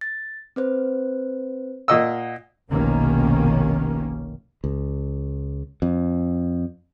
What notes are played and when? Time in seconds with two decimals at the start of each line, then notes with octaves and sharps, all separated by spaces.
0.01 A6
0.56 C4 B4 C5
1.88 A#2 D#5 F5 F#5 E6
2.71 F1 B1 B2 D#3 A#3 C#4
4.64 C#2
5.82 F2